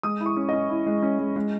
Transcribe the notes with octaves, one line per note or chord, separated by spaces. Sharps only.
G#3 D#6
E4
C#6
C#4
C#4 D#5
E4
G#3
C#4
G#3
G#3